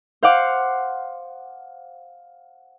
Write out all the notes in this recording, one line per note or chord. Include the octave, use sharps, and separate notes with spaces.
C5 F5 F#5 D6